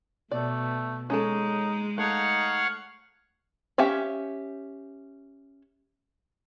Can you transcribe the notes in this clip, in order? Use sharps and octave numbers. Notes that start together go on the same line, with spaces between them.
B2 A3 D5
G#3 C#4 D#4 A4
A3 D#4 C#5 F5 F#5
C#4 G4 E5 F5